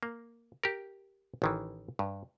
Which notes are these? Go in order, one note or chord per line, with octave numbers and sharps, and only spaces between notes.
A#3
G4 A#4
A1 D#3 E3
G2